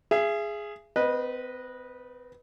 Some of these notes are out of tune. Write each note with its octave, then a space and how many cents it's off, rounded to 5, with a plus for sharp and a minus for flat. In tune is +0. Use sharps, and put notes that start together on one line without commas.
G#4 +0 E5 +40
C4 -45 B4 -15 D#5 -10